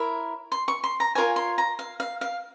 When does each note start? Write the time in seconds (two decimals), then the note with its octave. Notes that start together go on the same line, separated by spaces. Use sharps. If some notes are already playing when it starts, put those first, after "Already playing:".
Already playing: E4 A#4 C#5
0.52 C6
0.68 C#6
0.84 C6
1.00 A#5
1.15 F4 A#4 C#5 G#5
1.36 C6
1.58 A#5
1.79 F5
2.00 F5
2.21 F5